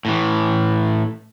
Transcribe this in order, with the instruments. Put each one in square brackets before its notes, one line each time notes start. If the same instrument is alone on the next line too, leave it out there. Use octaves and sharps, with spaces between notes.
[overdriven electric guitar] A2 E3